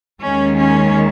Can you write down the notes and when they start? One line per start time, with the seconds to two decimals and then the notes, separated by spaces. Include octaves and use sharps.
0.22 D#2 D#3 G#3 C#4
0.58 C#4